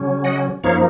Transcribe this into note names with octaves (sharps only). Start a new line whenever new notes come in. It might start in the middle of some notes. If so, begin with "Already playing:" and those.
Already playing: C#3 F#3 C#4
D#5 F#5
F#2 F3 A#3 D#4 C#5 F5